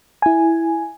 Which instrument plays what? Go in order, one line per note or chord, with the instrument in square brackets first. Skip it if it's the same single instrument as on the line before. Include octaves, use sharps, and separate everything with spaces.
[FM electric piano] E4 G#5